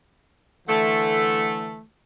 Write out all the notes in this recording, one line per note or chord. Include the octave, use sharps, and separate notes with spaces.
D3 E3 A3